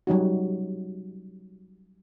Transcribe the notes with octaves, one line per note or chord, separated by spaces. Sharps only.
F#3 G3 D#4 F#4